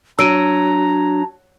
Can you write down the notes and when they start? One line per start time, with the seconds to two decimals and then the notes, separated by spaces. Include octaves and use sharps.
0.19 F#3 D4 A#5 E6 D7 D#7